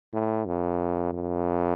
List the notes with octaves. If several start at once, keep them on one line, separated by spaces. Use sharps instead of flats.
A2
F2
F2